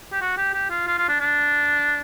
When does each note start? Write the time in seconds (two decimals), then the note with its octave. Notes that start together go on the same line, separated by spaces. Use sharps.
0.12 G4
0.21 F#4
0.38 G4
0.54 G4
0.70 F4
0.87 F4
0.98 F4
1.08 D4
1.20 D4